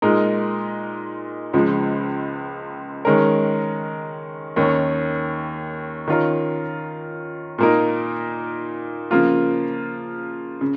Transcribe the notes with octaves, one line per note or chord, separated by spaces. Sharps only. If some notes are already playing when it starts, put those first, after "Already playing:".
A#2 G#3 D#4 A#4
C#2 C#3 F3 G#3
D#3 G#3 C#4 A#4
D#2 D#3 C#4
D#3 C#4 F4 A#4
A#2 A#3 D#4 A#4
C#3 F3 A#3 F4
C#3